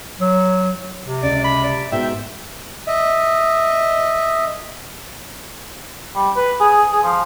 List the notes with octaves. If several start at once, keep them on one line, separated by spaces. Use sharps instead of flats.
F#3
C3
C#2 D5
B5
D5
G#2 B3 F#4 E5 G5
D#5 E5
G3
B4
G#4
G#4
F3